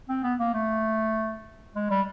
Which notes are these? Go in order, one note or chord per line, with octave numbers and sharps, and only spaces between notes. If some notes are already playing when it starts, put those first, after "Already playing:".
C4
B3
A#3
A3
G#3
G3